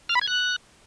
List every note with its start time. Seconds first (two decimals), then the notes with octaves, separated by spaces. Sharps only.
0.09 F6
0.15 B5
0.21 G#6
0.27 F#6